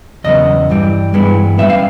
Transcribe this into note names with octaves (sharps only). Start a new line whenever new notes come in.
E2 C#3 F#3 B3 D#5
G2 E3 G3
G2 E3 G#3 B3
F#2 D#3 G3 B3 E5
F5